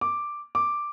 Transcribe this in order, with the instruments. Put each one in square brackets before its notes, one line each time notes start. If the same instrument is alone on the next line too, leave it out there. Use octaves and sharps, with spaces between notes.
[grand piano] D6
D6